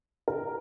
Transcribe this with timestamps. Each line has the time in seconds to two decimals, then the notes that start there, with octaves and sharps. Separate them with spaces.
0.28 A#4